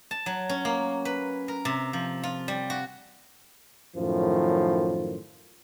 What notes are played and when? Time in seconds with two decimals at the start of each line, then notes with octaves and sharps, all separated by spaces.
0.11 A5
0.26 F#3
0.49 C#4
0.65 A#3
1.05 B4
1.48 A#4
1.65 C3
1.93 F3
2.23 F4
2.48 G3
2.70 F#4
3.96 F#2 A2 D#3 F3